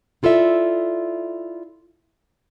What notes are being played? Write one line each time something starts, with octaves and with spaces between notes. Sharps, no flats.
E4 F4 A4 D5 E5